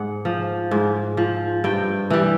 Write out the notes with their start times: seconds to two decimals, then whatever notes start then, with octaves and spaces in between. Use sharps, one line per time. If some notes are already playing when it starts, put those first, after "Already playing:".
Already playing: G#2 F#5
0.25 F3
0.71 G#2
1.17 F3
1.64 G2 G5
2.10 E3 G3